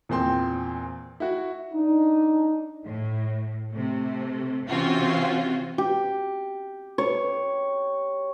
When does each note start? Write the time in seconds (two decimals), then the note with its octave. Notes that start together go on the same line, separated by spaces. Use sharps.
0.09 E2 A#2 C4 C6
1.20 E4 F#4
1.74 D4 D#4
2.85 A2
3.72 C3 A3
4.66 C3 E3 C4 C#4 F4 F#4
5.78 G4
6.98 C#5